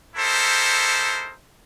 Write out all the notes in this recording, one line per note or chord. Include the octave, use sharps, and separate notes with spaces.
D#4 E4 G4 A4 A#4 C5